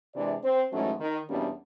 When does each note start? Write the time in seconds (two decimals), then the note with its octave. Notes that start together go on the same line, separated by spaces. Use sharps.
0.14 C3 E3 G#3 D4 D5
0.43 C4 C5
0.71 G#2 E3 F#3 A3 C#4 F#4
1.00 D#3 D#4
1.28 E2 B2 G3 A#3 C#4 D4